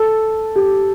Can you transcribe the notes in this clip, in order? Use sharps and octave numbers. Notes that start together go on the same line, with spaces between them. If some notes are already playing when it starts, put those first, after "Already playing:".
Already playing: A4
G4